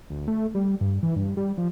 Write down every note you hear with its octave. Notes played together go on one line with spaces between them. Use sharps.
D2
A3
G3
G2
E3
G2
G3
F3